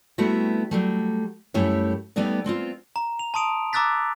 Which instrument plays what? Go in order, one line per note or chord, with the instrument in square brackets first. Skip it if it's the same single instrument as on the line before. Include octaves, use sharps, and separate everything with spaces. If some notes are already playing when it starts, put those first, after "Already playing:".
[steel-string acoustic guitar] G3 A3 B3 C4 E4 F#4
F#3 G3 A3
F#2 G3 A3 E4 G4 C#5
G3 A3 B3 D#4 D5
B3 C4 D#4 F4
[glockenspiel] A#5
F7
A5 C6 D#6 D7 F7
A#5 D6 E6 F#6 A6 B6